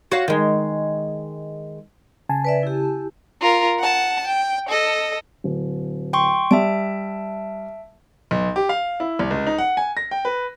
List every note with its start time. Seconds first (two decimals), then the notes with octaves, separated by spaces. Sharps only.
0.12 F#4 C#5 F5
0.28 D#3 G#3
2.29 C#3 G#5 A5
2.45 B4 D5 E5
2.63 E4 G4
3.41 F4 A#4
3.79 F#5 A5
4.27 G5
4.69 A4 D#5
5.44 D1
6.13 G5 C6 C#6
6.51 G3 E5 A5 D7
8.31 B1
8.56 G4
8.69 F5
9.00 E4
9.19 C2
9.31 C#2
9.47 D#4
9.58 F#5
9.77 G#5
9.97 A#6
10.11 G5
10.25 B4